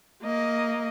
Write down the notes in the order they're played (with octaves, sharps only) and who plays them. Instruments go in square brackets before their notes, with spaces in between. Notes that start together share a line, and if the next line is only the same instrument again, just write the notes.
[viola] A#3 D#5